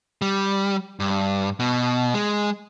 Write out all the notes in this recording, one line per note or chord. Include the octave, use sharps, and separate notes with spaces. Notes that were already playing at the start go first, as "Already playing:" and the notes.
G3
G2
B2
G#3